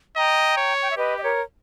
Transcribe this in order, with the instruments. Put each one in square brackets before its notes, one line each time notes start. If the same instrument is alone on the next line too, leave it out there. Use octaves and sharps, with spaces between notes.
[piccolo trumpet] D#5 [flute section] G5 A#5
[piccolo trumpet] C#5
[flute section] G5
E5
[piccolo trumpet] G4 [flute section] B4 D#5
[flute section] D#5
A#4 C#5